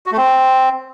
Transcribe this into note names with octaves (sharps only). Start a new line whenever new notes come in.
F#4
A3
C4